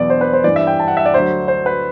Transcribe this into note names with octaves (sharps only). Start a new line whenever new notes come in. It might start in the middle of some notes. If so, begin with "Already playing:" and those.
Already playing: E2 B2 F#3 D5
C5
B4
C5
G2 E3 D5
E5
G5
A5
F#5
E5
D5
D2 D3 F#3 C5
C5
B4